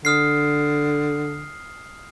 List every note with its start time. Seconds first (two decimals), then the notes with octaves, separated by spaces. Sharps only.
0.05 D3 D#6 F6 C7